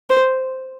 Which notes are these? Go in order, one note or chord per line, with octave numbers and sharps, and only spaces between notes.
C5